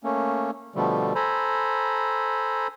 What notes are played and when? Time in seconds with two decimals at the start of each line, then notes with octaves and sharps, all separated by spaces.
0.04 A3 A#3 C#4
0.75 B2 D3 F3 G3 A3
1.15 A4 C5 G#5 A#5 B5